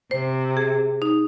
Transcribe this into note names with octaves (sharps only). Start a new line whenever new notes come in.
C3 C5
G#4
D#4